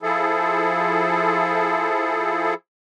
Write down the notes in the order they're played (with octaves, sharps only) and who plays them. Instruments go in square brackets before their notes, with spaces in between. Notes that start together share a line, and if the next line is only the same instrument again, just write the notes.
[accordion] F3 E4 G#4 A4